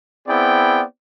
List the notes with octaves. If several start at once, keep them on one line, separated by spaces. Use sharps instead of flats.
B3 C4 E4 G#4 D5 G5